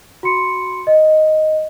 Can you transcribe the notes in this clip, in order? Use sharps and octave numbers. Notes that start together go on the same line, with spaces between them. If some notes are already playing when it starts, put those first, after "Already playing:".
F#4 B5 C6 C#7
D#5